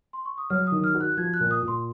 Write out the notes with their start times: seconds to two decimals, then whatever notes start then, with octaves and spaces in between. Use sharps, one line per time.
0.13 C6
0.25 C#6
0.38 D#6
0.50 F#3 F6
0.67 D#6
0.72 D#3
0.84 F6
0.95 F#4
1.01 F#6
1.17 F3 G#6
1.34 F#6
1.40 A#2
1.51 D#6
1.62 A#2
1.68 C6